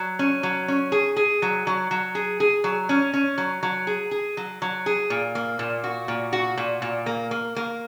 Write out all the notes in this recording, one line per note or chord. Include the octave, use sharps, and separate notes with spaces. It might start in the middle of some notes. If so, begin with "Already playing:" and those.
Already playing: F#3
C#4
F#3
C#4
G#4
G#4
F#3
F#3
F#3
G#4
G#4
F#3
C#4
C#4
F#3
F#3
G#4
G#4
F#3
F#3
G#4
A#2
A#3
A#2
F#4
A#2
F#4
A#2
A#2
A#3
A#3
A#3